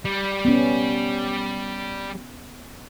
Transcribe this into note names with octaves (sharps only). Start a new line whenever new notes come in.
G3
B3 C#4